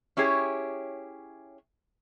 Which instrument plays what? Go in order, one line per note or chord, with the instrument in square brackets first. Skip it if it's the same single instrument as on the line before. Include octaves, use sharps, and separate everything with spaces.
[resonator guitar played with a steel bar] C#4 E4 G4 G#4 C#5